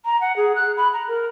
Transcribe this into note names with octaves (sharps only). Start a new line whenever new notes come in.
A#5
F#5
G#4
F#6
B5
A#5
A#4